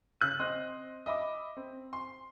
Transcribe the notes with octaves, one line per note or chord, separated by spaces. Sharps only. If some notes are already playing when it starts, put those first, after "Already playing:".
C#3 F#6 D#7
C4 D#5 C6
D#5 E5 B5 D6
C4
C6